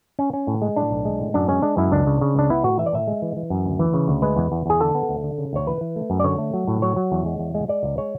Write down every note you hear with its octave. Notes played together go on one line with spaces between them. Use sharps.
C#4
C#4
A2
G#3
A2 D4
B1
G#3
A2
F#2 D4
G#3 C#4
G#3 D4
F#2 E4
C#2 D4
C#3
C#3
C#2 D4
B3 E4
A2 F#4
E3 E5
D5
A2 E5
G#3
E3
E3
F#2
D2
E3
C#3
D2
G#3 B4
E2
E2
E2 G#4
D3 A4
B3
D2
D3
C#3
D2 C#5
E3 B4
E3
A3
F#2
D5
D3 C#5
A3
F#3
A2
F#3 C#5
F#3
E2
G#3
E2
G#3
G#3 D5
C#2
G#3 C#5